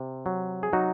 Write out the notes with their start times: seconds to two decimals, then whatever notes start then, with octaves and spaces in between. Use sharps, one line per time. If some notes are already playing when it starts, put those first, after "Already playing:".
Already playing: C3
0.26 F#3
0.63 G#4
0.73 F#3 D#4 F#4